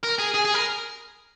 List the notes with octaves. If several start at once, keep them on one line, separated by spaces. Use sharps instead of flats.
A#4
G#4
G#4
G#4
A#4